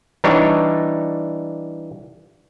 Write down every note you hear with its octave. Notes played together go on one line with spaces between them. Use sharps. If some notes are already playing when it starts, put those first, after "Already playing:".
E3 G3 D4 D#4 C#5